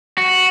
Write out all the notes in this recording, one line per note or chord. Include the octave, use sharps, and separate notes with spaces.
F#4